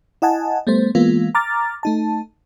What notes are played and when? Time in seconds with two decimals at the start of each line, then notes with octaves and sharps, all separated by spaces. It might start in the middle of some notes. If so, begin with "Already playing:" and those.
0.22 E4 D#5 F#5 G#5 A5
0.67 G3 A3 B3 C5
0.95 E3 G#3 A#3 B3 F4
1.35 A#5 D6 F6 A6
1.83 A3 D#4 A5